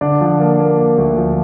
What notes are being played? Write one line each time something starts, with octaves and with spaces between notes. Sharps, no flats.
D3 D4 D5
F3
A#3
A#3
A#3
D2
F3